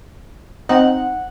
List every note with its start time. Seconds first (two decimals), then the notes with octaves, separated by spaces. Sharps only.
0.69 C4 D#4 F#5